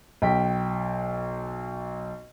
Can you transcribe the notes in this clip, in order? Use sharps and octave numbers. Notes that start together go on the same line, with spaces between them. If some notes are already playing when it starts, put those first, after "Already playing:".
B1 G5 B6